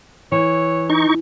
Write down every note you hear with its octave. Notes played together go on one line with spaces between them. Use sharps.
E3 C#5
D#4 C#6